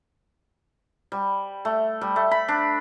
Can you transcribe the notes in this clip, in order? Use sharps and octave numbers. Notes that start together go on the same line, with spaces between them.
G3
A3
G3
A3
B5
D4